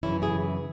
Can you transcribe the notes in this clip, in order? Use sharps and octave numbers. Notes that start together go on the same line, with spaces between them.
F#2 C#3 E3 C#4 E4
E4 G#4